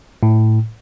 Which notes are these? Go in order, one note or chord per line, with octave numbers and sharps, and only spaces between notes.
A2